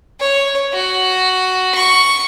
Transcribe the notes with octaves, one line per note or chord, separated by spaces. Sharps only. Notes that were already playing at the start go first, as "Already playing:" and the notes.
C#5
F#4
C#6